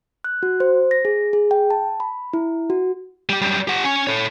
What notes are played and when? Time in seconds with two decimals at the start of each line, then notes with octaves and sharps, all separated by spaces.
0.24 F#6
0.43 F#4
0.60 C5
0.91 A#6
1.05 G#4
1.33 G#4
1.51 G5
1.70 A5
2.00 B5
2.33 E4
2.70 F#4
3.29 G3 G4
3.42 F#2 G3
3.68 G4 F#5
3.84 C#4
4.07 A4 C#5